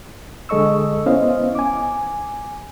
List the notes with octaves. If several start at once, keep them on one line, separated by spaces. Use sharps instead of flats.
D3 G#3 A4 D#5 C#6 E6
B3 C#4 E4 C5 D#5 F5
G#5 D6